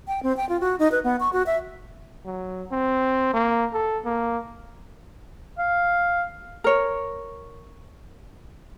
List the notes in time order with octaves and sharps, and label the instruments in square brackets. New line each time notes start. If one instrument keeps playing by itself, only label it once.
[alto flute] G5
C4
G5
F4
F#4
D#4
B4
B3
C#6
F#4
E5
[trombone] F#3
C4
A#3
A4
A#3
[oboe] F5
[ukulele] A#4 C#5